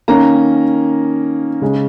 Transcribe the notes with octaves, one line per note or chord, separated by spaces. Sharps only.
D#3 A#3 C#4 A#5
C#3 G#3 C#4